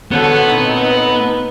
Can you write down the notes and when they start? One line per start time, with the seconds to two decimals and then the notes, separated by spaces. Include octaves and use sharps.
0.11 D3 B3 F#4 A4 C5 C#5 F#6
0.47 A#2 C4 D#4 B4